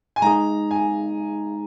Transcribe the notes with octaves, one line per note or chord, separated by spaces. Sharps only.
G#5
G#3 D#4 G#4 A#5
G#5